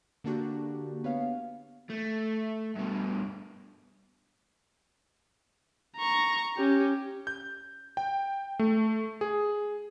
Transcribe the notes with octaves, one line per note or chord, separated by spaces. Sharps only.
D3 A#3 D4 F#4 G4
B3 C#5 F5
A3
G2 B2
A#5 C#6
C#4 G4
G6
G5
A3
G#4